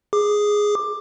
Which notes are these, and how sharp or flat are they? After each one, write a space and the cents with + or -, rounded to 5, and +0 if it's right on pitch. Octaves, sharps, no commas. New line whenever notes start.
G#4 +0 D6 +15